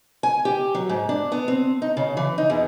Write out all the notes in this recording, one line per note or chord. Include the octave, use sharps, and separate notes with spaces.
G#5
G4
F#3
G#2
D4
B3
C4
D#4
C#3
E3
D#4
E2